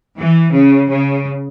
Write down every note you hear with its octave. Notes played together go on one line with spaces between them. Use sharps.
E3
C#3
C#3